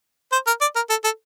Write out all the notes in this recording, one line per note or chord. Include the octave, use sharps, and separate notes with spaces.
C5
A#4
D5
A#4
A4
A4